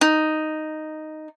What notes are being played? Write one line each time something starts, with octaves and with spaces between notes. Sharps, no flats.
D#4